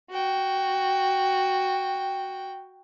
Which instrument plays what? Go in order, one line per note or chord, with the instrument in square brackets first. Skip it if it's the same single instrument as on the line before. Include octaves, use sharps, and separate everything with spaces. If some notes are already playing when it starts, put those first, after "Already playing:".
[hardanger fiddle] F#4 G5